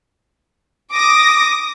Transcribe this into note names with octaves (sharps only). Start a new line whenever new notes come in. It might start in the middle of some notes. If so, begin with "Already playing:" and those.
D6 D#6 A#6